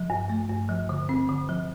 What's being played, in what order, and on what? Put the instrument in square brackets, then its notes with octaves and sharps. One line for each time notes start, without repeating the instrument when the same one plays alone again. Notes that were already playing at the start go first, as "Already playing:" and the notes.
Already playing: [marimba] F3
G2
A3
G2
F3
D3
C4
D3
F3